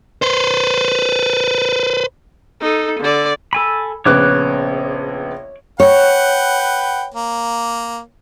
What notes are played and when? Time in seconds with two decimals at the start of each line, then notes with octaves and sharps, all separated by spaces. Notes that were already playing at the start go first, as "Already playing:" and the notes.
0.22 B4 C5
2.61 D#4 A4
3.00 D3 D5
3.53 A4 G#5 B5
4.05 A#1 C#3 B3 C#5 D6 F#6
5.80 B4 C#5 F#5 G5
7.14 A#3